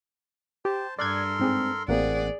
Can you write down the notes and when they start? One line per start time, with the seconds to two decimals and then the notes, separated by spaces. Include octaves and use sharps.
0.65 G4 C5 A5
0.99 G2 A4 A#4 D5 C6 F#6 G#6
1.39 G#2 C4 G#4
1.88 A1 A#3 C4 G#4 D5 F#5